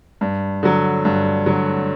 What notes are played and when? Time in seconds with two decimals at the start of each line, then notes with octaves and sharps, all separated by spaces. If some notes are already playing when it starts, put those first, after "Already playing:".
0.21 G2
0.63 D3 F#3
1.05 G2
1.46 D3 F#3